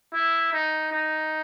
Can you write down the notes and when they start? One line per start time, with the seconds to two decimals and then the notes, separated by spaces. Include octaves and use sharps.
0.14 E4
0.53 D#4
0.92 D#4